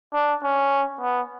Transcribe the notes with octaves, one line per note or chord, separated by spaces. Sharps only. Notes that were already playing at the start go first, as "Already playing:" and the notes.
D4
C#4
B3